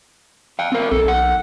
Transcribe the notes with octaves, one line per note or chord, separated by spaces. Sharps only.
F5 G5
C4 A#4
B1 A4
F#5